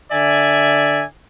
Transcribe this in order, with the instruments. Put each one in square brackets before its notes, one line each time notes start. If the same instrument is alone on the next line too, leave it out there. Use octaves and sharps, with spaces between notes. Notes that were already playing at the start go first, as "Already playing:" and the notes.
[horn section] D3 D5 E5 G#5